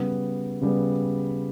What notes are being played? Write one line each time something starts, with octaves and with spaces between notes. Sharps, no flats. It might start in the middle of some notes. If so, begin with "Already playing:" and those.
Already playing: C#3 G3 B3
C#3 G3 B3